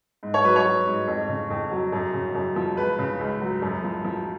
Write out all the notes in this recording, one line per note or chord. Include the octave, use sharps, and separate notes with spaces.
G#2
C#5
F#3 B4
C#5
F#3
G#2
F2
C#3
F2
F#3
F#2
C#3
F#2
F3
C#2 B4
C#3
C#2
F#3
F#2
F3
F3